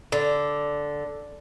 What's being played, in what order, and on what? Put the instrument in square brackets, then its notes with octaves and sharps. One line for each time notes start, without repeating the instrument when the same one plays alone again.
[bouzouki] D3